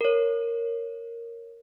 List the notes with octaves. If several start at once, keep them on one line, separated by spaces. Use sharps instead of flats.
A#4 C#5